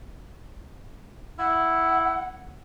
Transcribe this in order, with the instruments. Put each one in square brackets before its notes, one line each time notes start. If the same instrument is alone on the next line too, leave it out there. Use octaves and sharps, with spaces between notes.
[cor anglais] E4 [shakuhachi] F#5